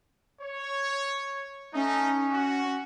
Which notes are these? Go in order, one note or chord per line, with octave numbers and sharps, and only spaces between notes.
C#5
A3 C#4 D#4
F#4